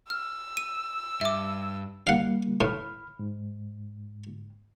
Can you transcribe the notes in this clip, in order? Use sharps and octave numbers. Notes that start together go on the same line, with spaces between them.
E6 F6
D#7
G2 E5 D6
G3 A#3 F5 F#5
A2 B5 F6
G#2